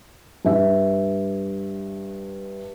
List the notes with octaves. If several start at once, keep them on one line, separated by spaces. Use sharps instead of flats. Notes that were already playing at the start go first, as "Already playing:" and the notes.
G2 E5